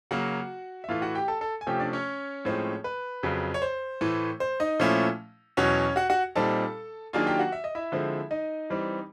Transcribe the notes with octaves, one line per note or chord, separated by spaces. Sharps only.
C#3 F#3 A#3 F#4 F#5
E5
A2 E3 A3 F4 F5
F#4 F#5
G4 G5
A4 A5
A4 A5
G#5
C3 F3 A3 C#4 G4 G5
D4 D5
C#4 C#5
A2 F3 G#3 C4
B4
F2 C#3 F#3
C#5
C5
A2 E3 A3
C5
D#4 D#5
A#2 F3 A3 C#4 E4
E2 B2 F#3 C#4 C#5
F#4 F#5
F#4 F#5
A#2 G3 C4 D#4 A4 A5
D#3 F#3 A#3 D4 F4 G#4 G#5
G4 G5
F#4 F#5
E5
D#5
E4 E5
D3 F3 G#3 C4
D#4 D#5
E3 G3 C4